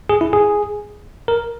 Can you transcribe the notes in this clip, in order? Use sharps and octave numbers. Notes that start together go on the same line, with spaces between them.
G#4
E4
G#4
A#4